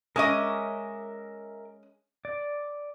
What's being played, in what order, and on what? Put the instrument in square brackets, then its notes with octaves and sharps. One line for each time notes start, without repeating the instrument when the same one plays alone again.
[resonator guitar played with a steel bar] G#3 C#4 D#5 [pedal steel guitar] A#4 E5 D6
[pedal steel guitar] D5